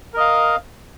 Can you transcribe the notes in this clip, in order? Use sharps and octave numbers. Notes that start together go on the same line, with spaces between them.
A#4 D#5 F5